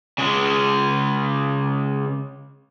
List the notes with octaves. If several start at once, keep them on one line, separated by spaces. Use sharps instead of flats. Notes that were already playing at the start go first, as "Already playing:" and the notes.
C#3 G#3